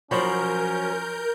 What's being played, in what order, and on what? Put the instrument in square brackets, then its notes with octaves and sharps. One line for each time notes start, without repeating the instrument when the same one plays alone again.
[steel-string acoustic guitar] F3 F#3 [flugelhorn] C#4 [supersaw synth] A#4 G6 [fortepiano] C5 C#5 B5